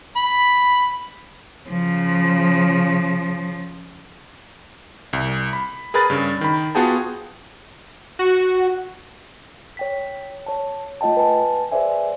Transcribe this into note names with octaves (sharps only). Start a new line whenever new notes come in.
B5
C#3 F3
C2
B5
G#4 A#4 B4 B5 A6
G2 C#3
D#3 B5
B3 F4 F#4 G#4 G5 A5
F#4
C#5 G5 B6
C#5 A5
A3 F4 D#5 G5 A5
B4 G#5 A5
G#4 B4 C5 D5 E5 G#5